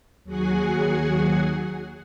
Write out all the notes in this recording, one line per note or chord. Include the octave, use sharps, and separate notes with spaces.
D#2 F#3 F#4 G#4 F#5 G#5